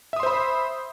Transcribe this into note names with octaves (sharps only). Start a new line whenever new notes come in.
C5 E5 B5 C6 D#6